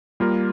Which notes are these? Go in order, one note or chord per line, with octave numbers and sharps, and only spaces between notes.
G3 A#3 F4 A#4